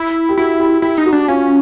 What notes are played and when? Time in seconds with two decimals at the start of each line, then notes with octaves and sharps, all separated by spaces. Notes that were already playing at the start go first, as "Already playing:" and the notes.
Already playing: E4
0.29 G4
0.37 E4 F#4
0.60 G4
0.82 E4 G4
0.98 D#4
1.06 F#4
1.13 D4
1.28 C#4 F4